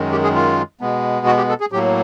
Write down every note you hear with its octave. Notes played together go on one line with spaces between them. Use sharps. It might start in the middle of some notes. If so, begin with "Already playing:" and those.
Already playing: F#2 D#3 G#3
G4
G#4
F4
B2 G#3 B3
F#4
G4
A4
G#4
A2 F#3 A#3 G4